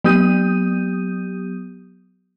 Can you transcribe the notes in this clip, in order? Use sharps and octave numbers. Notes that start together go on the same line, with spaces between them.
F#3 B3 G4 D#6 G6 D#7